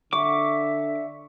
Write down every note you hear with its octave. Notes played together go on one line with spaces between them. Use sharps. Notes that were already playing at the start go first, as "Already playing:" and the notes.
D3 E5 C#6 D6